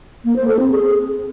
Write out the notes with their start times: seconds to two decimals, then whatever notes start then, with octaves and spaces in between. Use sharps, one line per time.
0.25 A#3
0.36 C5
0.48 A4
0.59 C4
0.71 G#4